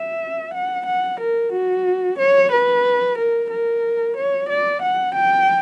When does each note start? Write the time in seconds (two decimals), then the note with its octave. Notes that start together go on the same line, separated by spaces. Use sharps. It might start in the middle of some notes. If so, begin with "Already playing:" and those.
Already playing: E5
0.54 F#5
0.86 F#5
1.20 A#4
1.53 F#4
2.19 C#5
2.52 B4
3.18 A#4
3.50 A#4
4.17 C#5
4.49 D5
4.82 F#5
5.15 G5